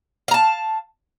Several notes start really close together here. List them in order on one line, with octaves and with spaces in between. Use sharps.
F5 A#5 A5